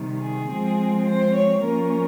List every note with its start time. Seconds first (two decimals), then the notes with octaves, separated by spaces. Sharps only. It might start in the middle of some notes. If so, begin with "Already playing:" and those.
Already playing: C3 D#3 G3
0.21 G#4
0.50 F3 G#3 C4
1.05 C5
1.35 C#5
1.63 F3 A#3 C#4 A#4